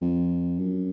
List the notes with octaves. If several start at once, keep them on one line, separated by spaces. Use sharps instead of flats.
F2
F#2